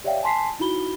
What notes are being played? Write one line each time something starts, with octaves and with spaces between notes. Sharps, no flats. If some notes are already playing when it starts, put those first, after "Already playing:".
G4 C#5 D5 E5 F5 G5
G#5 A5 C6 B6 C7
D#4 E4 F#4 B5 G7